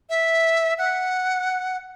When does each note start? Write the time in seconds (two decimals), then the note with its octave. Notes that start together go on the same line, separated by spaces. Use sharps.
0.10 E5
0.78 F#5